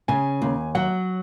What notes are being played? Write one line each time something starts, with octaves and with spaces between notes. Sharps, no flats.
C#3 G#5
D#2
F#3 F#5